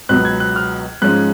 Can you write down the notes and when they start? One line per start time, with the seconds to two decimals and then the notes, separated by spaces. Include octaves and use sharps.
0.09 C#2 B2 F#3 B3 F#6
0.25 G#6
0.40 F#6
0.56 F6
1.02 G#2 F3 G#3 C#4 F#6